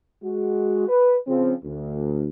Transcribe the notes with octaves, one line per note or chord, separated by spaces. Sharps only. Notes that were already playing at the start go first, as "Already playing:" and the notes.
G#3 F#4
B4
C#3 F3 C4
D2